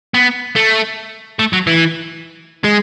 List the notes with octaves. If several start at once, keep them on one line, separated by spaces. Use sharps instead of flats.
B3
A3
A3
F#3
E3
G#3